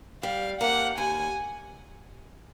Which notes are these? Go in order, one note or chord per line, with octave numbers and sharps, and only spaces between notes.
G3 F5
A#3 D4 G4 F#5
D#2 G#5